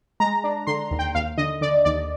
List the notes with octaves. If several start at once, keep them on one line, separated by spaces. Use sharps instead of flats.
G#3 A#5
D4
D3 C6
D#2
G5
D#2 F5
D3 D#5
D3 D5
D#2 D5